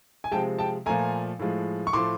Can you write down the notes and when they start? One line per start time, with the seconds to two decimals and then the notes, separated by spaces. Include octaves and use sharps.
0.24 G#5
0.32 C3 F3 G#3 G5 A5
0.59 G5 A5
0.86 A#2 F3 A3 G#5 A#5
1.39 A2 F3 G#3
1.87 C#6
1.93 A2 F3 A3 C6 D6